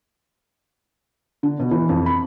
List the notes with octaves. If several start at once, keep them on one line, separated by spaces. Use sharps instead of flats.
D3
B2
E3
F2
B5